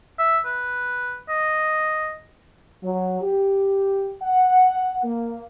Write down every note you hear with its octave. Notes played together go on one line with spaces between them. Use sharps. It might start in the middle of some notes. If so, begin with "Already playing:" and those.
E5
B4
D#5
F#3
G4
F#5
A#3